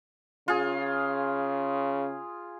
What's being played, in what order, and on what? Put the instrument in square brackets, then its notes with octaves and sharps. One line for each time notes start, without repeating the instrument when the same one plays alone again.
[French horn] C#3 [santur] F4 G#4